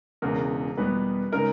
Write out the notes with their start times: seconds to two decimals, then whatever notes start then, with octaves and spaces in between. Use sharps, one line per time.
0.22 E1 E2 C#3 A#4
0.77 E2 B2 G3 B3 B4
1.32 C#3 G#3 D#4 A#4